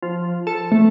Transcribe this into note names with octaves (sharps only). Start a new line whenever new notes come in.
F3
A4
A3